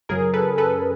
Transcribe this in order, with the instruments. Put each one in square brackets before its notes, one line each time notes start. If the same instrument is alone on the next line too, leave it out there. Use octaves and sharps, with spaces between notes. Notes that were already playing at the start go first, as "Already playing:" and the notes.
[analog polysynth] F#2 C#3 F#3 G#4 A#4
A4 B4
A4 B4